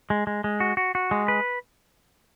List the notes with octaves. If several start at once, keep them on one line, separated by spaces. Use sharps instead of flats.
G#3
G#3
G#3
F#4
F#4
F#4
G#3
B4